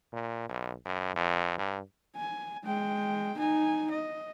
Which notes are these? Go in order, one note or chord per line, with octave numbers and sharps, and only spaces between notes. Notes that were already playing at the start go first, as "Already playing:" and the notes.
A#2
B1
F#2
F2
G2
G#5
G#3 G5
D#4 G#5
D#5